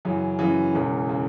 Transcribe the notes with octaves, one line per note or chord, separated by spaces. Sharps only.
F#2 C#3 E3
F#2 C#3 E3
E1 E2 C#3
C#3